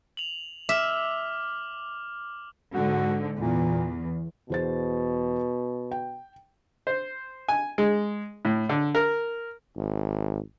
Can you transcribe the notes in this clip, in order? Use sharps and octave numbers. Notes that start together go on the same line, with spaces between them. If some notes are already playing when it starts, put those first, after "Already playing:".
F7 F#7
E5 D6 F6
G#2 D3 F#4
E2 A#2
E2 B2 C5 A6
G5
C5
G#5
G#3
A2
D3
A#4
G#1